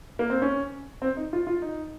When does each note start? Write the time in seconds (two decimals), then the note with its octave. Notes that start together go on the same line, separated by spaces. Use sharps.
0.19 A#3
0.30 C4
0.42 C#4
1.02 C4
1.17 D#4
1.33 F4
1.47 F4
1.62 D#4